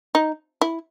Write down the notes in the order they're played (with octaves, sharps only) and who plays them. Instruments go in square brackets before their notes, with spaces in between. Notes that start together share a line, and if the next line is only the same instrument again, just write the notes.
[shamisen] D#4
E4